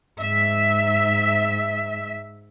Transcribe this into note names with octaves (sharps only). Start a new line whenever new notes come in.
G#2 E5